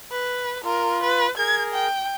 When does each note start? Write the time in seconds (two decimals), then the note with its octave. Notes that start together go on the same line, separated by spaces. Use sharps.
0.12 B4
0.64 F4 A#4
1.03 B4
1.38 G#4 A#4 G#6
1.74 G5